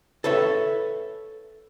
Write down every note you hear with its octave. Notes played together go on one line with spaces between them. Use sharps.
A4 B4 C#5 E5